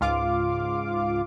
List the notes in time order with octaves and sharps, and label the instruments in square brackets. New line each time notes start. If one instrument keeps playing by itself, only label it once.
[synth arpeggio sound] C#2 G#2 F4 F5 D6